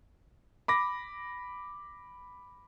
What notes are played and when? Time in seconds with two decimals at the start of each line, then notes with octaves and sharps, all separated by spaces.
0.68 B5 D6 A#6